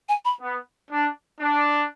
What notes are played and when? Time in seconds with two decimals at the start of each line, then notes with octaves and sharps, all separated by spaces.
0.09 G#5
0.25 B5
0.41 B3
0.91 D4
1.40 D4